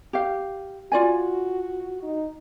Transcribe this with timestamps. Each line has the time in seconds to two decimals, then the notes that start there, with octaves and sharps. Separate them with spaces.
0.13 G4 F5
0.92 F4 F#4 D5 G#5
2.03 D#4